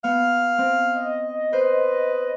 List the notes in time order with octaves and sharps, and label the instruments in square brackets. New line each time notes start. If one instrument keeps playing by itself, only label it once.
[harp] B3 [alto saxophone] F5
[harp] C4
[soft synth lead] D#5
[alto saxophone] B4 [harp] C5